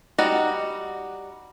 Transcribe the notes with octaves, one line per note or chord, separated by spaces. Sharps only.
G3 D#4 F#4 D5